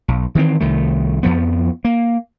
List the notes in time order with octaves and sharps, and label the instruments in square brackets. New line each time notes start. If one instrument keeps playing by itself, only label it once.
[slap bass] B1
D#3 E3 G#3 C4
C2 D#3 A3
F2 F3 B3
A#3